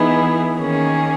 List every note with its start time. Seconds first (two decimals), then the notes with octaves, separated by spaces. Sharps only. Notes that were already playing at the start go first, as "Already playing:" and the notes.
Already playing: E3 B3 D#4 E4 G#4
0.57 D#3 A#3 C#4 G#4